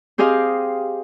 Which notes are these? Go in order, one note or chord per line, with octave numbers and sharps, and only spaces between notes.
C4 G4 G#4 D#5 F5